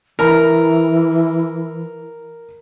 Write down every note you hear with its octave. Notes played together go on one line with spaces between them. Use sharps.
E3 A#4 A#5 B5